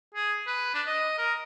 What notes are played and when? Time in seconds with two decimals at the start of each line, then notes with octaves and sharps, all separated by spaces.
0.14 G#4
0.47 B4
0.74 D4
0.87 D#5
1.18 A#4